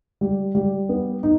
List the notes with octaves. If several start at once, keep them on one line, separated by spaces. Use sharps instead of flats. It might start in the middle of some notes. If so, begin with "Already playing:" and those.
G3
G3
B3
D#4